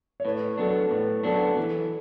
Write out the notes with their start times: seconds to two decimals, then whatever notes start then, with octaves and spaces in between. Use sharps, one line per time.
0.20 C#5
0.25 A2 B4
0.58 F#3 B3 D4 A4
0.90 A2 B4
1.23 F#3 B3 D4 A4
1.57 E3 A4